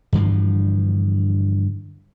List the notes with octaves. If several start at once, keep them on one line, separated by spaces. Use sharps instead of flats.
G2 D3 E3 F3